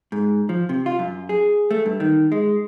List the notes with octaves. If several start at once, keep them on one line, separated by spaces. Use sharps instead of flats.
G#2
F3
C3
F4
F#2
G#4
A3
G2
D#3
G#3